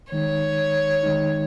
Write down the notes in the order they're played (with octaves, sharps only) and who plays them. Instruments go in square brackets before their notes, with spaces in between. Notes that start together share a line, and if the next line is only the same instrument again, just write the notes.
[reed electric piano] D#3 G#3 D#4 [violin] C#5
[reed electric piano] D#3 G#3 D#4